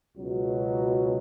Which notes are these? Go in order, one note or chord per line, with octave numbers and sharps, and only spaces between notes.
C#2 B2 F#3